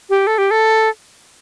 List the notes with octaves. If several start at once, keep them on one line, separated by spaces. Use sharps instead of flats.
G4
A4
G4
A4